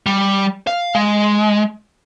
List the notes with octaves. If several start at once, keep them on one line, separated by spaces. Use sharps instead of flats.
G3
F5
G#3